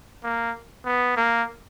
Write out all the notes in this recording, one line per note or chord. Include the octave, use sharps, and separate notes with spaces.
A#3
B3
A#3